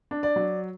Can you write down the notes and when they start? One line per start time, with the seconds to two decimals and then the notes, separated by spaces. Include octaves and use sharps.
0.11 D4
0.23 D5
0.36 F#3